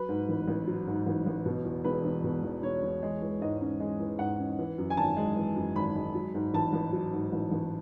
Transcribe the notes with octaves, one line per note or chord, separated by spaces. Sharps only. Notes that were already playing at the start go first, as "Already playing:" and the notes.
Already playing: F#3 B4
G#2
A1
A1
F#3
G#2
A1
A1
B2
E2
E1 B4
E1
B2
E2
E1 C#5
E1
G#3
E3
G#2 D#5
C#4
G#3
E3
G#2 F#5
C#4
E3
F#2
G#5
G#1 A5
G#3
E3
F#2
G#1 B5
G#3
F#3
G#2
A1 A5
A1
F#3
G#2
A1
A1